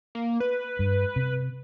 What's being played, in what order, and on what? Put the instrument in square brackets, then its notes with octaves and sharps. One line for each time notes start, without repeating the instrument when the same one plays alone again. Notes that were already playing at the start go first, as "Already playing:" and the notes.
[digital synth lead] A#3
B4
[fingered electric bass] G2
C3